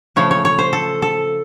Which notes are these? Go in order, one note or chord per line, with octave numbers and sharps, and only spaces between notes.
C#3 F3 A3 C#5
C#5
C#5
C5
A4
A4